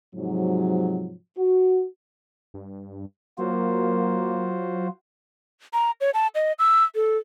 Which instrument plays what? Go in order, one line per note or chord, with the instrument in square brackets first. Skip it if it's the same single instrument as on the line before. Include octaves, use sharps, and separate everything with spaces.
[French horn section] G#2 C3 F3 F#3
F#4
[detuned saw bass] G2
[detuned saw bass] F#3 [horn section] A#3 [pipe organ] F4 F#4 C5
[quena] A#5
C#5
A5
D#5
E6
A4